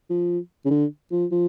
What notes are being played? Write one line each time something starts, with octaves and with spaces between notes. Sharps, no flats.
F3
C#3
D3
F3
F3